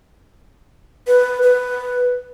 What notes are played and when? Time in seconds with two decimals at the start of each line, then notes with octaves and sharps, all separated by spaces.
1.07 B4
1.42 B4